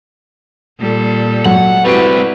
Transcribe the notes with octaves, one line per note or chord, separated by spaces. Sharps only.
A#2 G3 A4
F#3 F#5
G3 G#3 C4 E4 F#4 G4 B4 D7